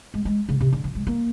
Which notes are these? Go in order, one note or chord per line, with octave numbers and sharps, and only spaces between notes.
G#3
G#3
C#3
C3
D3
F3
G#3
A#3